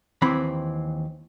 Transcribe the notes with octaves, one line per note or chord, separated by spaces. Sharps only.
D#2 E3 C4 B5